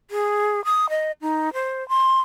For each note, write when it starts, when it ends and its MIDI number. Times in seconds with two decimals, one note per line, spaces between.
0.11 0.64 68
0.65 0.89 87
0.90 1.12 75
1.21 1.53 63
1.53 1.87 72
1.89 2.20 84